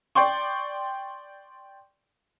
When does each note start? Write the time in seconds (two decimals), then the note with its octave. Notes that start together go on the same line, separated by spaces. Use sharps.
0.15 D5 G5 C6 C#6